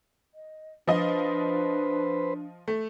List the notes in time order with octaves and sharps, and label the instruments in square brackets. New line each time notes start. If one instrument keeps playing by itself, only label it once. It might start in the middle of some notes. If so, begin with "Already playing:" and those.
[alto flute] D#5
[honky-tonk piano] F3 D#5 [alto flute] D4 [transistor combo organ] B4 C5
[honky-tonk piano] A3